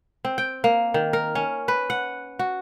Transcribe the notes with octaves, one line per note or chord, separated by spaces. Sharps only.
C4
G5
A#3
D#3
A#4
C#4
B4
F#5
F#4